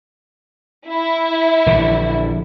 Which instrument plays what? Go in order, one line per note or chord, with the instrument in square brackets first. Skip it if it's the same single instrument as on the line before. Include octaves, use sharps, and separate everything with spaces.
[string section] E4
[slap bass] A#1 D3 E3